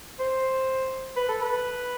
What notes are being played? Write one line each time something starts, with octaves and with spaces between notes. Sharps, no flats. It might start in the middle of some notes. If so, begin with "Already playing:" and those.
C5
B4
A4
B4